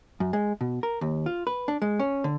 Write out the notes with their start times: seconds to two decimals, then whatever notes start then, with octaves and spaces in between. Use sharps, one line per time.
0.20 F#2
0.33 G#3
0.61 B2
0.83 A#4
1.01 D#2
1.26 F4
1.47 B4
1.68 D4
1.82 G#3
2.00 C#4
2.24 D3